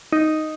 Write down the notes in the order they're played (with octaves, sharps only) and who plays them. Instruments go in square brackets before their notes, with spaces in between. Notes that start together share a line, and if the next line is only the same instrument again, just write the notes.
[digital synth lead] D#4